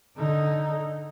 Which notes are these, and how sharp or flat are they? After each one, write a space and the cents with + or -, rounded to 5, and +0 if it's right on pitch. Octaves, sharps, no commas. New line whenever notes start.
D3 +5 D#4 +0